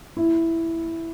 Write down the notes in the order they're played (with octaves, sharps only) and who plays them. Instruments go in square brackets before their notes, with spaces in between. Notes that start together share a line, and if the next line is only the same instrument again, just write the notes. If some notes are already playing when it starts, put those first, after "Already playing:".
[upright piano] E4